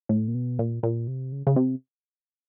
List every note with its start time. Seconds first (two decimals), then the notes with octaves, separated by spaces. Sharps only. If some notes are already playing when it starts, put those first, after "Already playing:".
0.09 A2
0.28 A#2
0.34 B2
0.59 A#2
0.83 A#2
1.07 C3
1.32 C#3
1.47 C#3
1.56 C3